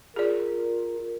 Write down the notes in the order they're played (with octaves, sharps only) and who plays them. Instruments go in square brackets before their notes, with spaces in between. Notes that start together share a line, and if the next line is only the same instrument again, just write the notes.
[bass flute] F4 [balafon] G#4 D5 [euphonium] A#4